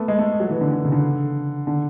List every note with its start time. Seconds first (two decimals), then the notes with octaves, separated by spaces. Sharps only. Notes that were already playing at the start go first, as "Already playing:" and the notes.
Already playing: A3 B3
0.08 G#3
0.19 A3
0.40 F#3
0.50 E3
0.61 D3
0.71 D3
0.85 C#3
0.92 D3
1.67 D3